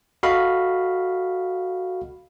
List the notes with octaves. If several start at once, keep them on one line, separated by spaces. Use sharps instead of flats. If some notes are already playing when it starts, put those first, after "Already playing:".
F#4 A4 D#5 F5 B5